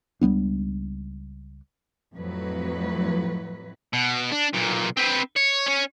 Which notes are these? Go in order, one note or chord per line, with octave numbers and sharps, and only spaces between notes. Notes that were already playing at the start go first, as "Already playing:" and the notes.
C#2 G3 B3 D4
F2 A2 F#3 B4
B2
D4
B1 A#2
C4 B4
C#5
C#4 C#5